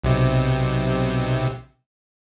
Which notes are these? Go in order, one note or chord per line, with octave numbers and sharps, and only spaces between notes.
B1 C3